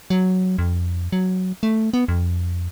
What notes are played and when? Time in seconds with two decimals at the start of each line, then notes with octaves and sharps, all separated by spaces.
0.10 F#3
0.58 F2
1.12 F#3
1.63 A3
1.93 B3
2.08 F2